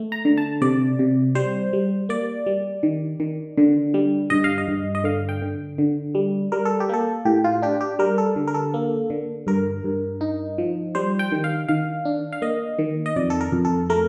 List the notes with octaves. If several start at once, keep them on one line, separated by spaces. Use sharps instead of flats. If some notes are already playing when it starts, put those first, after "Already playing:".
Already playing: A3
A#5
D3
A5
C3 D5
C3
G3 C5
G3
A#3 D5
G3
D#3
D#3
D3
G3
G2 D#5
F5
D#5
G2
D#5
D3 F5
G5
D3
D3
G3
G3 A#4
A4
G4
A#3 A4
A2 G4
F4
D4 G4
G4
G3 A#4
A4
D3
A#4
A4
A#3
D3
G2 A#4
G2
D#4
F3
G3 C5
G5
D#3
F5
D#3 F5
D4
F5
A#3 D#5
D#3
D#5
F2 D5
A4
A#4
F2
A4
A3 A#4